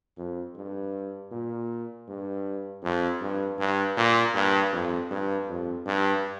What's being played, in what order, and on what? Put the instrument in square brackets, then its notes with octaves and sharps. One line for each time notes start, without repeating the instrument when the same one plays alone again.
[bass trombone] F2
G2
A#2
G2
F2
G2
G2
A#2
G2
F2
G2
F2
G2